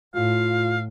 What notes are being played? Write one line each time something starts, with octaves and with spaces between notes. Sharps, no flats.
A2 F4 F5